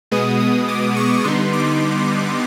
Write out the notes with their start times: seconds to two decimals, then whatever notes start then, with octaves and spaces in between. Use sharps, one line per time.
0.11 B2 G#3 B3 D#6
0.40 D#6
0.68 D6
0.96 C#6
1.24 D3 G3 B3 D#4 C6
1.53 D6